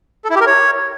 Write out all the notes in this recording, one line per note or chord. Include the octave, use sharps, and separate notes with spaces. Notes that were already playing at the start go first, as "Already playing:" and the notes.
A4
E4
G4
A#4
C#5